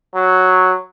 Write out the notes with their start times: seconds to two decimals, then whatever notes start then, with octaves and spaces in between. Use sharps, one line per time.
0.15 F#3